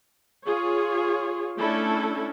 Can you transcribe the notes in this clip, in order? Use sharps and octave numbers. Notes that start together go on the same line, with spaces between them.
F4 G#4 C#5
A3 C#4 D4 E4 A4